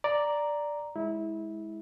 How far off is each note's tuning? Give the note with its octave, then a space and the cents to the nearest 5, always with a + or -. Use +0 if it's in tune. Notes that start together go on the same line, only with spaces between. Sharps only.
D5 +0 A#5 +0
G#3 +0 E4 -25